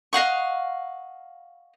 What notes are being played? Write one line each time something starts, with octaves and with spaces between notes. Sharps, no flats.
D#5 F5 F#5 C#6